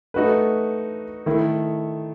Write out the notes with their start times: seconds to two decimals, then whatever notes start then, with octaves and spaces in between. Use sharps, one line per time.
0.14 A3 D#4 F#4 B4
1.26 D#3 A3 E4 A4